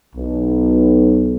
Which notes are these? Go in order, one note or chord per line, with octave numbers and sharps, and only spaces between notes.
B1